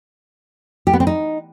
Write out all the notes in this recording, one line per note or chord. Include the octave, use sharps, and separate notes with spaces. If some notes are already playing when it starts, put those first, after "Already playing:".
G4
B3
C4
D#4